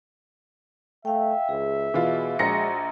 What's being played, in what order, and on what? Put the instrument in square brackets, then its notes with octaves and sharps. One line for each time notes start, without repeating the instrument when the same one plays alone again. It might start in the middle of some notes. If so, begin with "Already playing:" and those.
[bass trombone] A3 [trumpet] E5 [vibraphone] F5 G5
[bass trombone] C#2 [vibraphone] G#4
[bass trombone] B2 [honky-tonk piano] E3 F4
[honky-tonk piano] A#1 A#6 C#7 [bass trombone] G#3 [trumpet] F#4 [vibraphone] D#5 A#5